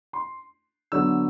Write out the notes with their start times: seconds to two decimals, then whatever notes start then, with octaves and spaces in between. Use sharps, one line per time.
0.13 C6
0.92 D3 F#3 B3 E6